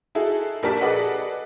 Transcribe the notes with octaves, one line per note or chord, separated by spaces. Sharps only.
D#4 E4 F#4 G#4 A4
A#1 G4 A#4 D5 A5 B6
G#4 A4 B4 D5 D#5 F#5